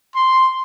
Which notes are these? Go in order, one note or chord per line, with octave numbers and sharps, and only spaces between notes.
C6